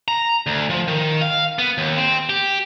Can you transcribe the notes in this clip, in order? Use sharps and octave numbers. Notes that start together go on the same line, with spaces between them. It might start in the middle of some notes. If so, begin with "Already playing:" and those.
A#5
D2
F3
D#3
F5
B3
D#2
C4
G4